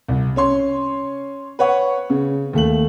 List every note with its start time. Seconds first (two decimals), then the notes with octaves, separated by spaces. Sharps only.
0.08 C2
0.36 C#4 C#5 C6
1.59 B4 C#5 F#5 C#6
2.10 C#3
2.53 D#2 A3 F#7